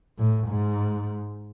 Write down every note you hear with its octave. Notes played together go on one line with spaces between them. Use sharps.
A2
G#2